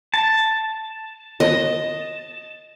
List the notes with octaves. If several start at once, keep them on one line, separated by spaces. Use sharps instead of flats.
A5
D#5